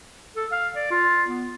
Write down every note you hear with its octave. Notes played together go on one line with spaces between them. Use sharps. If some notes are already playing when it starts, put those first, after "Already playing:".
A4
F5
D5
F4
B3